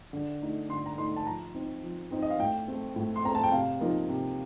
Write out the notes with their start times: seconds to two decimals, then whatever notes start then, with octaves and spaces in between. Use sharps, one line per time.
0.13 D3
0.42 A3 D#4
0.69 D3 C6
0.86 A#5
0.98 A3 D#4 C6
1.16 A5
1.26 F3 A#5
1.54 C4 D#4
1.82 F3
2.11 C4 D#4
2.22 D#5
2.30 F5
2.39 A2 G5
2.68 A3 C4
2.96 A2
3.16 C6
3.24 A3 C4 A#5
3.35 A5
3.43 G5
3.52 C3 F5
3.81 F3 A#3 D#4
4.09 C3